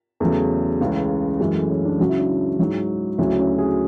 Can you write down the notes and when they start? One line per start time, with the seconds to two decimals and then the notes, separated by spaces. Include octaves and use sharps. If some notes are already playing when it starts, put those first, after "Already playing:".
0.20 E2 C#3 F#3 A3
0.81 C#2 C#3 E3
1.40 F#2 E3 G#3
1.55 A3
1.69 C#4
1.85 D4
1.99 C#2 C#3 F#3 F#4
2.10 E4
2.18 D4
2.28 E4
2.59 G#2 F#3
3.18 D2 C#3 F#3 E4
3.39 C#4
3.58 G#4